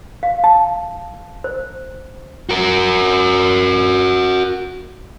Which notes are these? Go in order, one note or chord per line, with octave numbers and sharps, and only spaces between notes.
F5
A5
C5
F#4 A#4